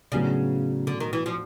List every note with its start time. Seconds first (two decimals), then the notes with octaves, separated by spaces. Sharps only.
0.12 A2 C#3 F#3 B3 D4
0.87 D3
1.00 D#3
1.13 E3
1.26 F3